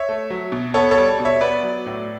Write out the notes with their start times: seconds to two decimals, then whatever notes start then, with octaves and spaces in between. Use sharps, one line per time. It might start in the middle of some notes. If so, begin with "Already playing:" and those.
Already playing: C#5 E5
0.09 A3
0.30 F#3
0.52 B2
0.74 B3 A4 C#5
0.91 A4 C#5
0.98 G3
1.20 B2
1.25 C#5 E5
1.41 B3 B4 D5
1.63 F#3
1.86 A2